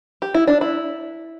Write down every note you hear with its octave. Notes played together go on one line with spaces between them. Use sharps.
G4
E4
D4
E4